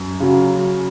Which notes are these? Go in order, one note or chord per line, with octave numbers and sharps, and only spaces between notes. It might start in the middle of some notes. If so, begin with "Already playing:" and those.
Already playing: F#2
C#3 F#3